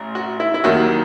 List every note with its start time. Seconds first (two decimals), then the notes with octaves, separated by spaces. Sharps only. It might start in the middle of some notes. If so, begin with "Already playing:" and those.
Already playing: A1
0.15 F#4
0.40 E4
0.54 E4
0.64 D#2 D#3 F#3 F#4